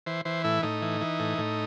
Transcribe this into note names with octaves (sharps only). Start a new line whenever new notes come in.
E3 C5
E3 C5
A2 E4
A2 D#4
E3
E3
A2
A2